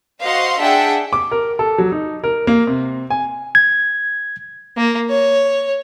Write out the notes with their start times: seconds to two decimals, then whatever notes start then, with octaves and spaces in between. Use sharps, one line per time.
0.21 F#4 C5 D#5 F5 F#5 C6
0.58 D4 G#4 E5 F#5 G5 A5
1.13 D6
1.31 A#4
1.59 A4
1.78 F#3
1.92 D#4
2.24 A#4
2.47 A#3
2.67 C3
3.10 G#5
3.55 G#6
4.77 A#3
5.09 C#5